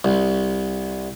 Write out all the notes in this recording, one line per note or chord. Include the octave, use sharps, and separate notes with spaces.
C2